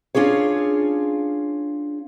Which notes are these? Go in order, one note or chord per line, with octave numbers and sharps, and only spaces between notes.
C#4 D4 F4 G#4 C#5